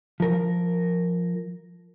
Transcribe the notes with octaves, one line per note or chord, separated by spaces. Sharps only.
F3 A#4